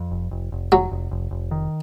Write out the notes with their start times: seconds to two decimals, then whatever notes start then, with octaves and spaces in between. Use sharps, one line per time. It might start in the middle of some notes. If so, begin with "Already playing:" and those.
Already playing: F2
0.11 F1
0.31 F1
0.52 F1
0.72 F1 F#3
0.91 F1
1.11 F1
1.31 F1
1.51 D#3